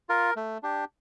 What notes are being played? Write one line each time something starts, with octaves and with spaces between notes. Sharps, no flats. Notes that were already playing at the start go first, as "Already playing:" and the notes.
F4 A#4
A3
D4 G4